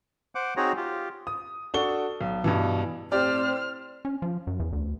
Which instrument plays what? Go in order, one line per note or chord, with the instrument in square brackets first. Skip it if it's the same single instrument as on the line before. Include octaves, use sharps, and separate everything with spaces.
[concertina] C5 F#5 D6
C4 D#4 F#4 G#4 C#5 A#5
F4 G4
[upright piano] D#6
D4 F#4 A4 C#6 G7
B1
G2 B2 E3
[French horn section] A2 C4 [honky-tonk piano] G4 D5 [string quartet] C5 [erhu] F6
[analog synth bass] C#4
F3
F#2
E2
D2